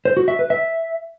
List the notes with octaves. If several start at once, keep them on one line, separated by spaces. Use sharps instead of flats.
C5
F#4
E5
B4
E5